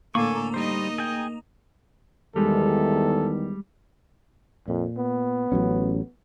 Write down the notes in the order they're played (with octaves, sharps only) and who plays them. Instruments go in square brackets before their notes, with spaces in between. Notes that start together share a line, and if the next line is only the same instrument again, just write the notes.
[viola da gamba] A2 D3 A4 [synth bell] A#3 [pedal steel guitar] G#5 C#6
[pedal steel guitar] G3 C5 [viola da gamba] D#4 D#5
[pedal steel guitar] G#4 G5
[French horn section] E2 D#3 [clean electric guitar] G3 G#3 [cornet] A4
[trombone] F2 [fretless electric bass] A#2
[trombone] B3
[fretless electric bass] A1 F#3 C#4